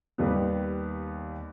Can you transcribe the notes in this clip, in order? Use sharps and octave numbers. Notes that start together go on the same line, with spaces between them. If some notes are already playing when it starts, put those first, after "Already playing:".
D#2 D#3 G3 B3